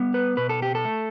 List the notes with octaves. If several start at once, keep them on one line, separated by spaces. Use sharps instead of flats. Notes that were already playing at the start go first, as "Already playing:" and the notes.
Already playing: G3 B3
B4
B2 B4
A4
G4
A4
A3